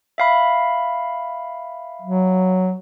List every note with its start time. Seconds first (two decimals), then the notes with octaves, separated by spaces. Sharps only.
0.18 E5 F5 B5
2.02 F#3